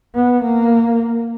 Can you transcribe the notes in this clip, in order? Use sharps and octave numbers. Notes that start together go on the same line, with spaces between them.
B3
A#3